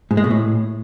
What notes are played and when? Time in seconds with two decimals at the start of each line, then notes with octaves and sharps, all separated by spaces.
0.11 G#2
0.17 G#3
0.24 B2
0.31 A2